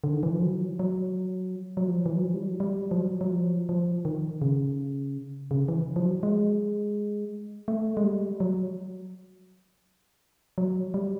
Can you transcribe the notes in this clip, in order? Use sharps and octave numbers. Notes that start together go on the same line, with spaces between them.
D3
D#3
E3
F3
F#3
F#3
F#3
F3
E3
F#3
F3
G3
F#3
G3
F3
F#3
F#3
F3
F3
D#3
C#3
C#3
E3
F3
F#3
G#3
A3
G#3
G3
F#3
F#3
G3